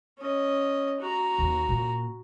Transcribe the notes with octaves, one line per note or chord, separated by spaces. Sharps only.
C#4 D#5
F#4 A#5
D#2
A#2